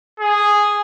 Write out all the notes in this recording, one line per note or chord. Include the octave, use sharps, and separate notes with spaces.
G#4